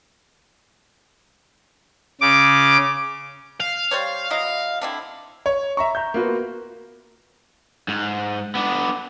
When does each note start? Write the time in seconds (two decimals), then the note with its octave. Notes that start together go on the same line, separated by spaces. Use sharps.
2.21 C#3 D6
3.60 F5
3.91 G3 C5 C#5
4.30 F#3 E4 D#5
4.82 D3 C4 E4
5.46 C#5
5.77 E5 A#5 C#6
5.95 A#5 G6
6.14 A#3 B3 F4 F#4 B4
7.88 G#2
8.55 B3 D4